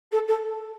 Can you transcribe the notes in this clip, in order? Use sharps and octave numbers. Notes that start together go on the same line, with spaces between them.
A4
A4